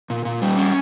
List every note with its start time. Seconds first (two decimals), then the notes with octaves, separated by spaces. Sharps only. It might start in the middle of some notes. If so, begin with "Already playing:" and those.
0.10 A#2
0.25 A#2
0.42 G3
0.58 C#4